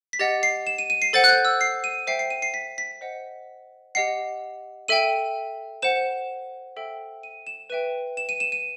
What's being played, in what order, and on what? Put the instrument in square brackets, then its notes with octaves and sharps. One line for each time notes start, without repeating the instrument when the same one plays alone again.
[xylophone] B6
G4 D#5 F#5 A6
C7
E7
D#7
D#7
C7
A4 C5 F#5 A6
F#6
G6
E6
C7
D#7
C5 E5 G5 C7
C7
D#7
C7
B6
B6
C5 D#5 F#5
G4 D#5 F#5 C7
A4 E5 G5 D#7
C5 F#5 E7
A4 E5 G5
D#7
E7
B4 E5 G5 D#7
E7
D#7
E7
D#7